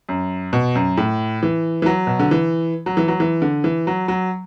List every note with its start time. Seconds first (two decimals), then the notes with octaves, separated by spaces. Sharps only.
0.09 F#2
0.53 B2
0.75 F#2
0.97 A2
1.43 E3
1.82 E3
1.86 F#3
2.07 B2
2.19 D3
2.31 E3
2.86 F#3
2.97 E3
3.08 F#3
3.20 E3
3.42 D3
3.64 E3
3.87 F#3
4.08 F#3